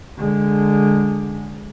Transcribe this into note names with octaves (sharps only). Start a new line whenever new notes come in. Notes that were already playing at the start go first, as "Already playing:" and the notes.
D3 G#3